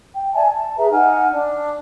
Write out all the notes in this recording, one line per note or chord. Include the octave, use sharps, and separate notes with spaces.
G5
D5 E5 G#5 A5
A5
G#4 B4 E5 A#5
D#4 F#5 G#5 F6
D4